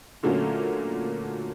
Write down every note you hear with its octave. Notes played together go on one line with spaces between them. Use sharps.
A#2 D3 F#3 A3 A#3 C#4